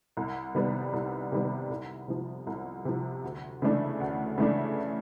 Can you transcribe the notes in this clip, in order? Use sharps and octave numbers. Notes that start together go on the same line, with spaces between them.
C2
C3 D#3 G3 B3
C2
C3 D#3 G3 B3
C2
C3 F3
C2
C3 F3
D2
C#3 E3 A3 D4
D2
C#3 E3 A3 D4